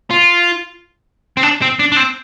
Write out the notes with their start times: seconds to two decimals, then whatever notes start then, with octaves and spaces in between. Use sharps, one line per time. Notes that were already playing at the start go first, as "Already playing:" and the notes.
0.11 F4
1.37 C4
1.43 D4
1.62 C4
1.79 D4
1.92 D4
1.97 C4